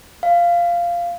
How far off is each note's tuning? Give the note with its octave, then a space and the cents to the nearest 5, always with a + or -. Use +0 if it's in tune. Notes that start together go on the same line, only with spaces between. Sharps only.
F5 -10